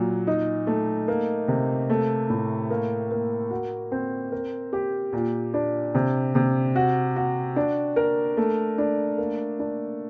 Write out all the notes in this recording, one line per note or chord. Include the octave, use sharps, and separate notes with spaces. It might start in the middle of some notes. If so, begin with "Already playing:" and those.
Already playing: A#2 F#3
D#4
A3
A#3
C3
A3
A2
A#3
A#3
F#4
C4
A#4
G4
A#2
D4
C3
C3
F#4
F#4
D4
A#4
A3
D4
A#3
D4